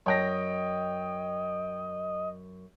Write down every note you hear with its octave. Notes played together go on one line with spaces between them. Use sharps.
F#2 C#5 D#5 G5 A#6